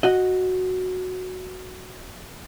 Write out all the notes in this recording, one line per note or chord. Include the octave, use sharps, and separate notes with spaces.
F#4 D#5